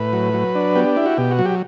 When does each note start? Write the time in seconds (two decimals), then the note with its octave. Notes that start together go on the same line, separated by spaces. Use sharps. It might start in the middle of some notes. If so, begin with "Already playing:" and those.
Already playing: A2 B4
0.13 F#3
0.34 F#3
0.55 D4
0.75 B3 G4
0.97 E4
1.06 F#4
1.18 B2 G4
1.31 F#4
1.39 F#3
1.45 G4